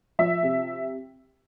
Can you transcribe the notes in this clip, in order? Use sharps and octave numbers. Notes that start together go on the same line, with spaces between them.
F3 E5
C3